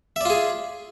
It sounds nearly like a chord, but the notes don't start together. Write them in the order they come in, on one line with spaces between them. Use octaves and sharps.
E5 D5 F4 G#4